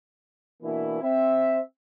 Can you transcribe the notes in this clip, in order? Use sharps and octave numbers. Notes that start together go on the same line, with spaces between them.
B2 E3 A#3 D4 E4
C4 E5